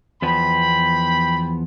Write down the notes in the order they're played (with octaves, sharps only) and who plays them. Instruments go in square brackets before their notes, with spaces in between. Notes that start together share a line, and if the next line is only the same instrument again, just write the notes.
[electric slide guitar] E2 F3 B3 [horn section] G5 B5